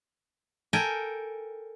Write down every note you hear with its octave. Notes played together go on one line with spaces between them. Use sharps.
A4 A#4 G5 G#5